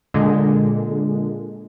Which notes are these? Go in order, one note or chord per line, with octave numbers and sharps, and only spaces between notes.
A#2 D3 G#3